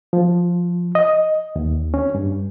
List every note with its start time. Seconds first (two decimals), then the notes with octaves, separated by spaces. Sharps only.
0.13 F3
0.95 D#5
1.56 D#2
1.94 C#4
2.15 G2